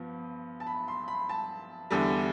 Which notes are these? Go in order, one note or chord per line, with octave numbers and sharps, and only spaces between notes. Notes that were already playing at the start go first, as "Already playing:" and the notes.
Already playing: G2 F3 B3
A5
B5
C6
B5
A5
E2 D3 G3